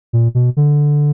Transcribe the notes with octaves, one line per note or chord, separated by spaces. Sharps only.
A#2
B2
D3